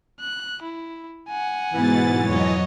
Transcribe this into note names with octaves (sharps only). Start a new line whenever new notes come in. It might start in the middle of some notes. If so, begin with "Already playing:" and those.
F#6
E4
F#5 G#5
G#2 B2 E3 B3 A6
F2 F#3 C#5 D#5